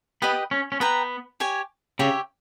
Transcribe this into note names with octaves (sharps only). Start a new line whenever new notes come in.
B3 G4 B4 D#5 G5
C#4
C#4
B3 B4 G5 A#5
G4 C#5 G#5
C#3 G4 C#5 E5